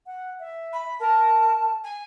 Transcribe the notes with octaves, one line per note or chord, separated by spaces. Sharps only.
F#5
E5
B5
A#4 A5
G#5